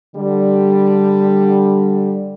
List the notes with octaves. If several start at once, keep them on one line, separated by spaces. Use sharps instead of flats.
D3 G3